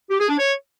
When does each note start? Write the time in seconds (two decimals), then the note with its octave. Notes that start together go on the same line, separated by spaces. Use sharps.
0.10 G4
0.20 G#4
0.29 D4
0.38 C#5